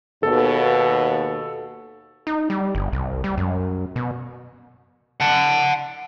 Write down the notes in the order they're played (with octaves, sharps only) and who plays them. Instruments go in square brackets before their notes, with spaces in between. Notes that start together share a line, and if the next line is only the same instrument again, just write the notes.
[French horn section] D#2 B2 [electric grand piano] A4
[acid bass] D#4
G3
G1
C2
G3
F#2
B2
[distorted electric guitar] F#5 A5